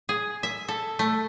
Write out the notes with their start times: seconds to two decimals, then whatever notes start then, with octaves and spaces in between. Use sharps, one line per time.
0.09 G#4
0.43 E5
0.68 A4
0.99 A3